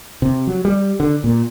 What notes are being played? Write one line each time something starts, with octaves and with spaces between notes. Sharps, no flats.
C3
F#3
G3
D3
A#2